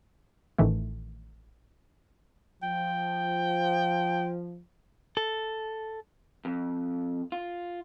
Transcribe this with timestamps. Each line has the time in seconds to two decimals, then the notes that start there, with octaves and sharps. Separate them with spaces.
0.58 A1 A2 D#3 E3 A3
2.63 F3 G5
5.17 A4
6.45 F2
7.32 F4